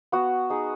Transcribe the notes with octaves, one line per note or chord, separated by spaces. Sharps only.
B3 F#4
D#4 G#4